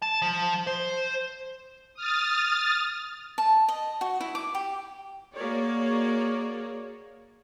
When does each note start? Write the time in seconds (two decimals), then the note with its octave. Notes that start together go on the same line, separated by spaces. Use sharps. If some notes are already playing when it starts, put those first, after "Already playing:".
0.02 A5
0.22 F3
0.67 C5
1.94 D#6 F6 A6
3.38 A5
3.68 D#5
4.01 F#4
4.21 E4
4.35 D6
4.55 G4
5.34 A#3 F#4 G#4 A#4 C#5 D5